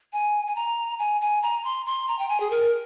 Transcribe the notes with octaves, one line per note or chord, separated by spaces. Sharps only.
G#5
G#5
A#5
G#5
G#5
A#5
C6
C6
A#5
G5
G#5
G#4
A#4